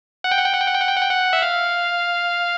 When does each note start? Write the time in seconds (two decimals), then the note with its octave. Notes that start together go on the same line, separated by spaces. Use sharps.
0.24 F#5
0.32 G5
0.38 F#5
0.46 G5
0.53 F#5
0.60 G5
0.67 F#5
0.74 G5
0.81 F#5
0.88 G5
0.96 F#5
1.02 G5
1.09 F#5
1.33 E5
1.42 F5